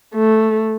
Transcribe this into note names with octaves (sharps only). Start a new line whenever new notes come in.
A3